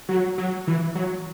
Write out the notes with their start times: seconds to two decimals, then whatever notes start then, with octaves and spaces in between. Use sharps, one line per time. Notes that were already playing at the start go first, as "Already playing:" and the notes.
0.09 F#3
0.38 F#3
0.67 E3
0.95 F#3